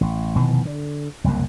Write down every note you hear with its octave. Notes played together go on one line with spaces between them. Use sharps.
A1
F1 B2 D#3 E3
D3
F#1 C2 F2 A#3